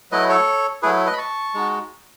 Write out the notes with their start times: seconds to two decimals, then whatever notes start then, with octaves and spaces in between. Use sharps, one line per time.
0.11 F#3 A3 E4 B4 D#5
0.29 A4 C#5
0.82 F#3 A3 E4 G#4 B4
1.06 B4 D#5
1.13 B5
1.18 A5 C#6
1.54 G#3 D#4 F#4